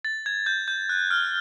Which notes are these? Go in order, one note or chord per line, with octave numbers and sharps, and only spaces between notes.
A6
G#6
G6
G6
F#6
F6